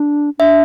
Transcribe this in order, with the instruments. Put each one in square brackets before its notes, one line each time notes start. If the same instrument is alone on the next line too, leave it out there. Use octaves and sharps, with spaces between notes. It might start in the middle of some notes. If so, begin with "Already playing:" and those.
Already playing: [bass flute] D4
[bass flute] D4 [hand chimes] E5